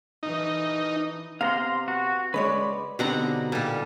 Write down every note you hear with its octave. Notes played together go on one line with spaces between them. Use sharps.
E3 D#4
C3 B3 F5 A#5 C6
F#4
C#3 G#3 B4 C#5 D5
B2 D3 G3 C4 D#4 F#5 A#5
A#2 G3 A4